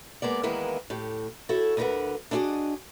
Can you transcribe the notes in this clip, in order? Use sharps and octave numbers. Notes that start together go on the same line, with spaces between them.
G#3 A#3 B3 D5
D#3 E3 G#3 A#3 B3 E4
A2 G4
E4 F#4 A4 C#5
D2 D3 E4 A#4 B4 F#5
D4 E4 F#4 G#4 D5 D#5